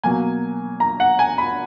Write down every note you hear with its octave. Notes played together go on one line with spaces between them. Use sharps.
B2 F#3 A#3 G#5
A#5
F#5
G#5
B5